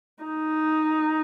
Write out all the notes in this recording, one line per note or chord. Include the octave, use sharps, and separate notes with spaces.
D#4